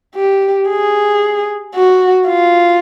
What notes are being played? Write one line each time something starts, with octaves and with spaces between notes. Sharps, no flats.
G4
G#4
F#4
F4